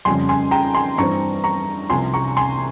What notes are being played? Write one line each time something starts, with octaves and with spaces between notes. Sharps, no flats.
F2 C#3 G3 G#5 C6
G#5 C6
G5 A#5
G#5 C6
G2 E3 G3 C4 A#5 C#6
A#5 C#6
C2 C3 F3 G#5 C6
A#5 C#6
G#5 C6